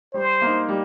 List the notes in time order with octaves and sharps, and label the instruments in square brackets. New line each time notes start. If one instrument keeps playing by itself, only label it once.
[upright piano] G3 [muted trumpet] C5
[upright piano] A#3 D#4
G3